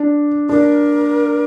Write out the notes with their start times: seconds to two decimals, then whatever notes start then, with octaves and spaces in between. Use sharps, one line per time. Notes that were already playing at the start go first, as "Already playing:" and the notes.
Already playing: D4
0.49 D4 A#4